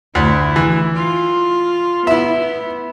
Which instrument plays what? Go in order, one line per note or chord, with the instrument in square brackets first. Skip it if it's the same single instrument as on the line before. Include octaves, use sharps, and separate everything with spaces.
[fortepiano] D2 [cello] E4
[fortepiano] E3
[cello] F4
[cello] B3 [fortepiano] E4 E5